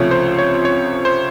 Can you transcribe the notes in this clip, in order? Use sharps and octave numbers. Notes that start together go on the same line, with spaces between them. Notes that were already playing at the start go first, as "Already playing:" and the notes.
Already playing: C#2 C3 F3 A3 C#4 C#5
C5
C#5
C#5
C5